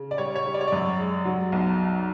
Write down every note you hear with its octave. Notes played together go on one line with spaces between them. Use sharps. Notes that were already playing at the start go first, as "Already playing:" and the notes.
Already playing: C#3
D5
G3 C#5
C#5
G3
D5
C#5
F#2 D5
G#3
F#3
B1